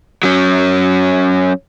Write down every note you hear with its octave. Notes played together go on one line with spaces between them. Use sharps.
F#3 C#4